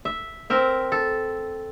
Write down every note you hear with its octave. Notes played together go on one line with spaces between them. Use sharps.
E5
C4 A#4 E5
A4